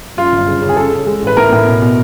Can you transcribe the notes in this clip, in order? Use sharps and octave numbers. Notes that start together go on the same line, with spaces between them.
F#2 F4
G1
C#3
C#3
G#4
C#3 A4
C#3
G#3
A1
B4
A2 A#4
A2
B2
B2